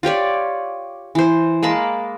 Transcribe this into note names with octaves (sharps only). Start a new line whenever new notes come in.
F4 G4 C#5 D5
E3 C5
G#3 A#3 A5 B5